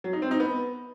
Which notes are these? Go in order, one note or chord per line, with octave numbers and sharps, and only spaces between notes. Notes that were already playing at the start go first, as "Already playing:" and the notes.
F#3
D#4
C4
D#4
B3